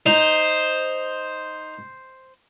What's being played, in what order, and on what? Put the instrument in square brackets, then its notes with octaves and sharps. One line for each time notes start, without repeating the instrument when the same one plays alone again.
[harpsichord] D#4 [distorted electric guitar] C5